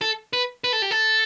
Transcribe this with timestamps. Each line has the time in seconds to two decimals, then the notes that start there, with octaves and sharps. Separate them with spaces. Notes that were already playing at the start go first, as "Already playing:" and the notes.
0.01 A4
0.33 B4
0.64 B4
0.73 A4
0.82 G4
0.91 A4